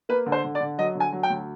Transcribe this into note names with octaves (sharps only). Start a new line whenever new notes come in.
A#3 B4
D3
C5
D3
D5
D3
F#3 D#5
D3
G#5
F#3
G5
D2